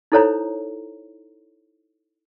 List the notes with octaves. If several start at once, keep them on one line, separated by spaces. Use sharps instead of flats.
D#4 E4 A4 C5 C#5 A#5